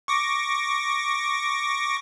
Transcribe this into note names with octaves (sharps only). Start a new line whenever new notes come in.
C#6 D6 A#6